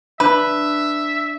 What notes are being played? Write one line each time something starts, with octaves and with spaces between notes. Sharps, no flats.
D4 B4 E5